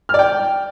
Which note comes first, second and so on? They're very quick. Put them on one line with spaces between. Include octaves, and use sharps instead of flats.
F6 D5 G5